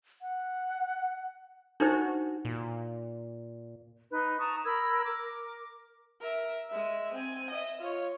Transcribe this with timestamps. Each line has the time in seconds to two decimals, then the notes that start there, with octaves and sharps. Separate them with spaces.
0.22 F#5
1.80 D4 D#4 F#4 C5
2.45 A#2
4.10 D#4 B4
4.39 A5 A#5 C#6 D#6
4.64 A#4 B5 E6 G#6
5.05 A#4 D6
6.20 A#4 E5
6.70 G#3 E5
7.13 C4 G#5
7.50 D#5 E5
7.81 F4 C#5